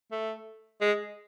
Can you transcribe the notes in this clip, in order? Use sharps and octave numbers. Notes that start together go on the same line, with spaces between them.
A3
G#3